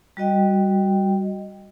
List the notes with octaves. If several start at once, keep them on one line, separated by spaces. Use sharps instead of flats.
G3 F#4 D#5 G5